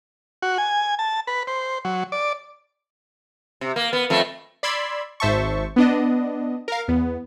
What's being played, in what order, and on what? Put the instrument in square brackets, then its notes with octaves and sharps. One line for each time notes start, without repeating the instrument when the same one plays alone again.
[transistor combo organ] F#4
G#5
A5
B4
C5
F#3
D5
[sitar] C3
A#3
B3
F2 A3
[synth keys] D5 B5 C6 E6 G#6
G#1 C5 E5 A5 C#6
B3 D4 D#5
A#4 F5
E2 B3